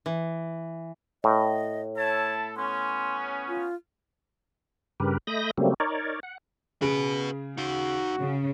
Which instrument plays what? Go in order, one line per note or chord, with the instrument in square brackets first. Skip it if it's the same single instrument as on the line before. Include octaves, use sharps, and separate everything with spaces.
[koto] E3
[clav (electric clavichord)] A2 [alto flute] D#5
[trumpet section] E4 A4 A5 [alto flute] C#5
[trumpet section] B3 C#4 [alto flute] C6
[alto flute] F4
[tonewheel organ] G2 C#3 G4 A#4 B4
A3 D#5 B5 D#6 G6 A#6
C#3 F#3 G3 A3 A#3 C4
D#4 A#4 C#5 D5
F#5
[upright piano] C#3 G#4 D7 [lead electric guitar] F#4 B4
[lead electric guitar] D#4 F5 [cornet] F#4
[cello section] C#3